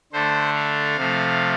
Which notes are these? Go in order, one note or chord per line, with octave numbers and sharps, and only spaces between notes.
D3 A3 D4 C5
F5
C3 F3 A3